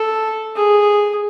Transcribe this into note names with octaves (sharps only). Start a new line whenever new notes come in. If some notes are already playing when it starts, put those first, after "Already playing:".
Already playing: A4
G#4